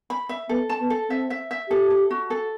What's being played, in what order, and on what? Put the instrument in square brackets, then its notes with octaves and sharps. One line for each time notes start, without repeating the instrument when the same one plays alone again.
[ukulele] B5
E5
[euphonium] B3 [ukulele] A4
[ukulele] A5
[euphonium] B3
[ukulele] A4
[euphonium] C4 [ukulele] E5
[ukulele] E5
E5
[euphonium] G4 [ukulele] A4
[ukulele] A4
F#4
A4